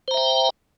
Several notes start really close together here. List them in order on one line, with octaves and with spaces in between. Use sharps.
C5 A#5 E5 G5